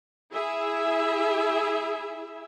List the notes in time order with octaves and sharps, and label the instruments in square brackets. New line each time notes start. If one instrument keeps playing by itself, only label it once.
[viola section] E4 G#4 E5